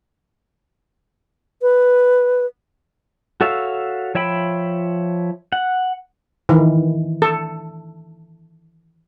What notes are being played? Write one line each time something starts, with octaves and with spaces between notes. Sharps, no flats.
B4
F#4 A4 C#5 E5 F5
F3 C#5 E5 G5 B5
F#5
D#3 E3
A4